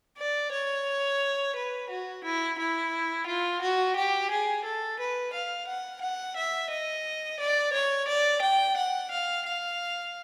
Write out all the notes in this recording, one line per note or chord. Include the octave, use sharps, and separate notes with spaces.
D5
C#5
B4
F#4
E4
E4
F4
F#4
G4
G#4
A4
B4
F5
F#5
F#5
E5
D#5
D5
C#5
D5
G5
F#5
F5
F5